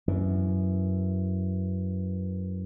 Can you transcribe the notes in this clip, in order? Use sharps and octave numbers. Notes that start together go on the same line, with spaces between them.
F#2 E3